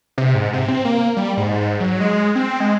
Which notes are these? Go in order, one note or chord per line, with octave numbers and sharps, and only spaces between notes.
C3
G#2
C3
C4
A#3
G3
G#2
G#2
F#3
G#3
C4
G#3